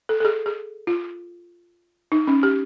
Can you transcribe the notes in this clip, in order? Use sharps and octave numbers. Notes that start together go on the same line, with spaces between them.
A4
A4
G#4
G#4
F4
D#4
C#4
G4